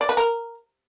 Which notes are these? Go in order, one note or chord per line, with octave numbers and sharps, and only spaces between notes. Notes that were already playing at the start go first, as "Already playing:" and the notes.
D5
B4
A#4